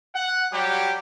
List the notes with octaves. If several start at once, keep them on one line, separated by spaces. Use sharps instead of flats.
F#5
F#3 G3 G4